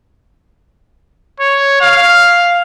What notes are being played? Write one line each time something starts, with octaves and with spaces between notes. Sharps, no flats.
C#5
F5